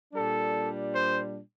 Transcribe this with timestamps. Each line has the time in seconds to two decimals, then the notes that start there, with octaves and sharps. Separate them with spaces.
0.13 A#2 G3 D4 A4
0.91 C5